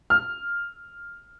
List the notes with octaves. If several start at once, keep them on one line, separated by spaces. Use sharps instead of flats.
F6